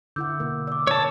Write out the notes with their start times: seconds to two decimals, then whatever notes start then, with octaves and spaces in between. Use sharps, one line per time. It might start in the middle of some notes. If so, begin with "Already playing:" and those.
0.16 D3 E4 F#5 D6 E6 G6
0.40 B2 A#3 A#4
0.67 D5 D6 E6
0.87 C#5 A5